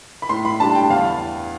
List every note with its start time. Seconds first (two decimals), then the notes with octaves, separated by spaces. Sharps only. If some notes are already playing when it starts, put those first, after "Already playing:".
0.22 B5
0.29 A2 C6
0.45 B5
0.60 G3 D4 A5
0.75 G5
0.90 E2 F5